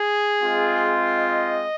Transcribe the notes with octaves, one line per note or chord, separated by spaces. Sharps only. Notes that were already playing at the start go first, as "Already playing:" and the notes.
Already playing: G#4
G#3 C4 F4
D#5